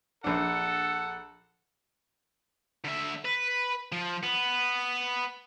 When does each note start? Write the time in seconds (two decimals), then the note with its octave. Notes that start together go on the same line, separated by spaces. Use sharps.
0.24 A#1 D4 A4 F#5
2.84 D3 E5
3.25 B4
3.92 F3
4.23 B3